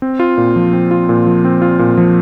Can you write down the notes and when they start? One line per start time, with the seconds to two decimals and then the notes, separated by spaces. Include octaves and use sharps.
0.02 C4
0.19 F4
0.38 A#2
0.56 F3
0.73 C4
0.91 F4
1.09 A#2
1.26 F3
1.44 C4
1.62 F4
1.79 A#2
1.98 F3